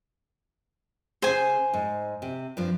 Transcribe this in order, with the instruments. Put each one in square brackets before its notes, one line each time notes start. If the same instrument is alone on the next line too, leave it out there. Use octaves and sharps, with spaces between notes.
[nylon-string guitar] C#3 G#4 [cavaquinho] C5 G#5
[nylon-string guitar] G#2
C3
G2 F3